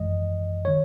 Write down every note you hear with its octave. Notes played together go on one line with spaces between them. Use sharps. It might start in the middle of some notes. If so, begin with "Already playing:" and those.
Already playing: G#1 F#2 E3 G#3 D#5
D#3 C#5